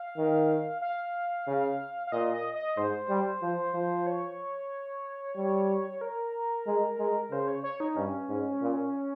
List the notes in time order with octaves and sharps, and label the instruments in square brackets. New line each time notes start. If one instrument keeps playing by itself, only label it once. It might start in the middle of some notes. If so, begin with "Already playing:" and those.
Already playing: [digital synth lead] F5
[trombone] D#3
[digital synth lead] F5
[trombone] C#3
[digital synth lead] F5
[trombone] A#2 [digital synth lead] D#5
[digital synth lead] D#5
D#5
[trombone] G#2 [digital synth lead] C5
[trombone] G3
F3
F3
[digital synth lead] C#5
[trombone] G3
[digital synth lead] A#4
[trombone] G#3
G#3
[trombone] C#3 [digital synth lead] C5
[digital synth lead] C#5
C#5
D#4
[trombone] G2 [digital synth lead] C#4
[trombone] G#2
A#2